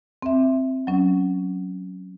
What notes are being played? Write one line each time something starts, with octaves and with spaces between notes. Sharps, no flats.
C4 E5
F#3 C#4